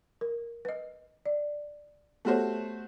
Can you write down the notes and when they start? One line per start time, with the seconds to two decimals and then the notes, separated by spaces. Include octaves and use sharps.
0.21 A#4
0.65 B4 D#5
1.26 D5
2.25 A3 B3 F#4 G4 C5 C#5